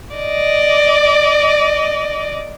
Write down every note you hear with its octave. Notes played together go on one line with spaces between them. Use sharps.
D5 D#5